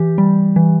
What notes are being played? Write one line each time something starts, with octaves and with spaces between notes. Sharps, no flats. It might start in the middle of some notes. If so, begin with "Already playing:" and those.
Already playing: E3 G4
G3
E3